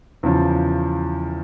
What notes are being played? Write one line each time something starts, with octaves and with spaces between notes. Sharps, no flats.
E2 C#3 F3